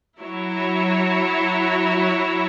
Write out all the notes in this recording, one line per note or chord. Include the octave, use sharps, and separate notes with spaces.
F#3 E4 C#5